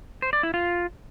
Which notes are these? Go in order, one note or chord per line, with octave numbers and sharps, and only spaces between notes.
C5
D5
E4
F4